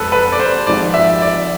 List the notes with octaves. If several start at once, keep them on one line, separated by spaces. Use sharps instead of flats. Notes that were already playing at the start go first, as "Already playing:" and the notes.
Already playing: F2 G#3 A4 B4
B4
D5
C5
G#1 G#2 F3 D5
E5
D5